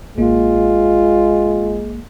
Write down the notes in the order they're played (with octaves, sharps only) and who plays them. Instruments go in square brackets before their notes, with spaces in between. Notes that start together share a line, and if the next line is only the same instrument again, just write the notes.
[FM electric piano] A1 A#3 [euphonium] G#3 [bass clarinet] F4